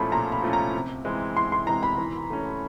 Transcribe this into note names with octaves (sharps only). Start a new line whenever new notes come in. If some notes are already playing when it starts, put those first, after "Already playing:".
Already playing: A#2 F3 A3 C#4 B5 C6
A#2 A#5
B5
F3 A3 C#4
A#5
C3
E3 G#3 C4
C3 C6
C6
E3 G#3 C4 A#5
B5
E3
A3 C#4